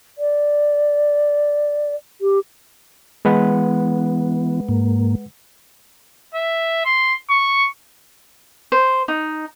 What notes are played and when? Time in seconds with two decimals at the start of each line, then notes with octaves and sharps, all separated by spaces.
0.18 D5
2.21 G4
3.25 E3 G#3 B3 B4 F#5
4.69 G#2 A#3
6.34 E5
6.85 C6
7.30 C#6
8.72 C5
9.08 D#4